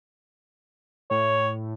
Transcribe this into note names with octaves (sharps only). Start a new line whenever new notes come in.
A2 C#5